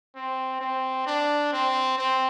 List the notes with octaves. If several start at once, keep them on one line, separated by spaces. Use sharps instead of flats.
C4
C4
D4
C4
C4